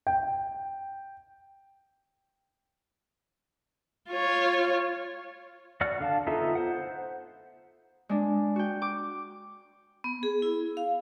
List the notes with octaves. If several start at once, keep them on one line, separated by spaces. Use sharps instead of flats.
G5
F4 C#5
F#4 D5 F#5 F6
D3 F5 A5
B3 D#4 F4 A4 E5
C5 F#5
G#3 D4
F#4 G5
D6
B3
G#4
E4
F5